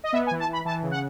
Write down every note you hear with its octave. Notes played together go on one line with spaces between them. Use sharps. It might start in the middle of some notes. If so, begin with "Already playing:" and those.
D#5
B3 E5
G#5
E3
A5
E3 B5
E3 A5
C#3
F#5